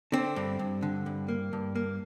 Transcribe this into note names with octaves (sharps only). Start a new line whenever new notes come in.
D3 C4
G2
G2
D3
G2
A#3
G2
A#3